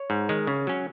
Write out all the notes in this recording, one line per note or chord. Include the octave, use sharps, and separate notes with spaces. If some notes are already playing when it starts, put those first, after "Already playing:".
Already playing: C#5
G#2
D#3 G#3
C#3
F#3 C#4